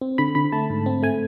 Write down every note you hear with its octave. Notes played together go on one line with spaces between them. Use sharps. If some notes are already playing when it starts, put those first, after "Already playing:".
C4
D3 B5
D3 B5
A3 A5
G#2
C4
A3 G#5